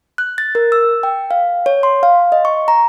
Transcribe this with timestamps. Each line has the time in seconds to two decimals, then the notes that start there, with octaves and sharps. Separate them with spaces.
0.18 F#6
0.38 A6
0.55 A#4
0.72 E6
1.03 G5
1.31 F5
1.66 C#5
1.83 C6
2.03 F5
2.32 D#5
2.45 C#6
2.68 A#5